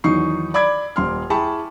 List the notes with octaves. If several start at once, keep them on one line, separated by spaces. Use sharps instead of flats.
E2 D#3 F#3 D#4 C#6 C7
D5 B5 D6 G#6
D#1 C6 F6
E4 G#4 G5 A5 B5 C#6